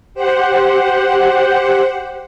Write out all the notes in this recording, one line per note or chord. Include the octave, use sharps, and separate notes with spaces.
G4 C5 F#5